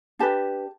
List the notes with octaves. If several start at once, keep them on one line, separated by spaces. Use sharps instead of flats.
D4 G4 B4 A5